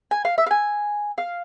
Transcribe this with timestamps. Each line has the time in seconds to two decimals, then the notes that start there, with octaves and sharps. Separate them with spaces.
0.11 G#5
0.25 F5
0.38 E5
0.46 F5
0.51 G#5
1.18 F5